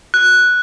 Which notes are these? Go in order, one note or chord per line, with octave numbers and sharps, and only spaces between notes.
F#6